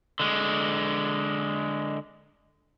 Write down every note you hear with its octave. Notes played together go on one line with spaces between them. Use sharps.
D3 G#3